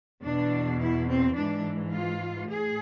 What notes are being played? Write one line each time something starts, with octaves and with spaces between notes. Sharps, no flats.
E2 B2 D4
E4
C4
G#2 E3 D4
F4
A2 G#4